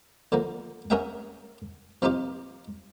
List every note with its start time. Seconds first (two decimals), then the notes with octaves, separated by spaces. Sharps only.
0.32 D3 F3 A#3
0.90 C#4 G#4 A#4 E5 F#5 G5
2.02 F3 C4 D#4 F4 G4